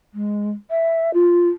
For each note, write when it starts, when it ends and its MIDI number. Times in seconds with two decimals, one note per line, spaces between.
0.14 0.50 56
0.70 1.10 76
1.14 1.49 65